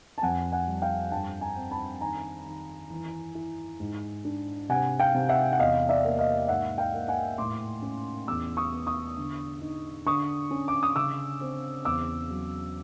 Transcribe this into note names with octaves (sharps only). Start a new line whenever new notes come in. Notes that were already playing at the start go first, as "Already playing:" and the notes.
A5
F2 F#5 G#5
F#5 G#5
G3
F5 G5
G2 G5 A5
G#5 A#5
C4
A5 B5
D#3 G#5 A#5
D#3
E3
E4
G#2
D4
C3 F#5 G#5
F5 G5
C3
E5 F#5
F#5
E2 D#5 F5
D5 E5
A#3
D#5 F5
G#2 E5 F#5
F5 G5
A#3
F#5 G#5
A2 C6 D6
C#4
E2 D6 E6
C#6 D#6
B3
C#6 D#6
D3
D#4
D3 C#6 D#6
C#4
D6
D#6
C#3 D6 E6
C4
E2 D6 E6
F#3